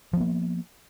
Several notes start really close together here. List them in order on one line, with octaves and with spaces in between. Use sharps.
F3 B3 A#3